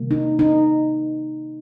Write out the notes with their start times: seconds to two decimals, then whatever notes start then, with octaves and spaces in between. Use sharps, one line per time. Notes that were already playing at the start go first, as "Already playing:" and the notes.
Already playing: C3 D#3 G3 A#3
0.11 D#4
0.39 D#4